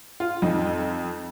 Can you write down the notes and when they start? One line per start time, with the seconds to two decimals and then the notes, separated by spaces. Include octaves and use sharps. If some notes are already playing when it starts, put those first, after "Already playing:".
0.20 F4
0.42 F2 D#4